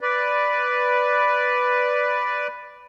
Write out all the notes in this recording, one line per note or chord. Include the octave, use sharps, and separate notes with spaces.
B4 D5